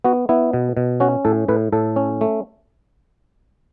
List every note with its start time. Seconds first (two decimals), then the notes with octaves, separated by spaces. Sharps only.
0.04 B3 F#4
0.29 B3 E4
0.53 B2
0.77 B2
1.00 C#4 F#4
1.25 A2 A4
1.48 A2 B4
1.72 A2 A4
1.96 C#4
2.21 A3